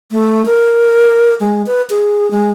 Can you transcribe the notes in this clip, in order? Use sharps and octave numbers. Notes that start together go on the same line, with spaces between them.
A3
A#4
G#3
B4
G#4
G#3